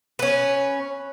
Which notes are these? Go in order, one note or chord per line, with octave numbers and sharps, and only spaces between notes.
C#4 B4